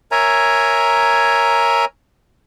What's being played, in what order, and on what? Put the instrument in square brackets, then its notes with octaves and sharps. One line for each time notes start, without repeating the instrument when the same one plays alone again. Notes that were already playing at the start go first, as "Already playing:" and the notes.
[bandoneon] A#4 C#5 E5 G#5 A#5